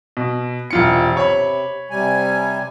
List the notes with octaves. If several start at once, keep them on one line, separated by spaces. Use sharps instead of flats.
B2
E1 C3 F4 C#7
C#5 B5
C3 G3 G#5